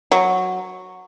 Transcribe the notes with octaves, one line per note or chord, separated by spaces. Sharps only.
F#3